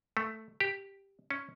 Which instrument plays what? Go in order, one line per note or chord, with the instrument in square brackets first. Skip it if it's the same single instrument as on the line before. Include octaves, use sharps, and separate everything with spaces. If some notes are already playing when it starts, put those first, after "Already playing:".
[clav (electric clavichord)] A3
G4
C#4